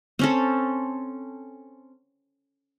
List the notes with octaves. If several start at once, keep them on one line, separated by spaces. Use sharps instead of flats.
C4 C#4 A4